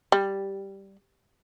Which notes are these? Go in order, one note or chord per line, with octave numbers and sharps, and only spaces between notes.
G3